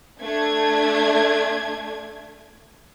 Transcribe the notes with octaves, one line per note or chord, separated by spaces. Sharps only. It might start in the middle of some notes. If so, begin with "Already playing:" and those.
A3 D4 G#6